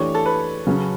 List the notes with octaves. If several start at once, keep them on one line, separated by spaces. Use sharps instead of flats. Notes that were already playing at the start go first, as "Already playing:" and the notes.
Already playing: E3 A3 D4 G4 C#5
A4
B4
C#3 F#3 C#4